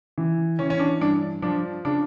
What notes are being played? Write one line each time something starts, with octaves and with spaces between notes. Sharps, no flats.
E3
E3 C#4
C#4
D4
G2 D4
F3 D4
C#3 D4